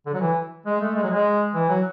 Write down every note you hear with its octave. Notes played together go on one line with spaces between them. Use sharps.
D3
F#3
E3
G#3
A3
G#3
F#3
G#3
E3
F#3